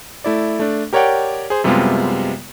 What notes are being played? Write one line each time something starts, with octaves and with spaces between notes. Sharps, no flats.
A3 E4 D5
A3 D4
G4 A#4 C#5 D5 F#5 G5
G#4 C5
F#2 C3 G3 G#3 B3 F4